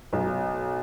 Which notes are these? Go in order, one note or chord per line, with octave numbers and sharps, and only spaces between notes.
B1